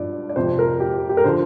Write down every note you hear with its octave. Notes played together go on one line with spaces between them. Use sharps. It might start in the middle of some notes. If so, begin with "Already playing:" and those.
Already playing: G2 F3 D5
D5
F2 C3 F3 C5
A#4
G4
G4
A#4
D3 F3 C5